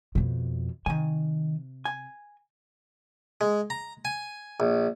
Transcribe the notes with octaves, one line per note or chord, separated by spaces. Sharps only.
F2 B2
C3 D#3 G#5
G#5
G#3
A#5
G#5
A#1